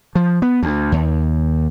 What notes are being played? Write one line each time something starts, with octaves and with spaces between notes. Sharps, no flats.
F3
B3
D2
D#2